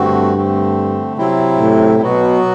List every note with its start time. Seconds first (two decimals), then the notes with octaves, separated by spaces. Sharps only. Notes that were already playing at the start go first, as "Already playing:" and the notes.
Already playing: G2 D3 A3 C4 F#4
0.34 D3 A3 C4
1.17 C3 F#3 C4 E4
1.59 A2
2.01 B2 F#3 B3 F#4